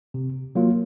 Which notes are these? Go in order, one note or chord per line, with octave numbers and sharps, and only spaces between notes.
C3
F#3 A#3 F4